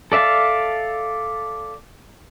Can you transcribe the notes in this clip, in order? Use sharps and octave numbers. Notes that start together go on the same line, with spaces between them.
A4 D5 E5 F5 A5